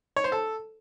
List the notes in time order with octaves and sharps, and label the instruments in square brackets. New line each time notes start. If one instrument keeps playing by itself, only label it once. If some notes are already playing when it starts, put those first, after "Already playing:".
[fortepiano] C#5
C5
A4